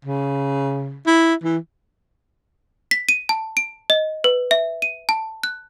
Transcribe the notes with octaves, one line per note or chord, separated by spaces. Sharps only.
C#3
E4
E3
B6
D#7
A5
D7
D#5
B4
E5
D#7
A5
F#6